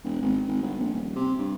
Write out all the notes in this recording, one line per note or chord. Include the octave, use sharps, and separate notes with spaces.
E1
G#1
G#1
G1
A#1
D#1
C3
G2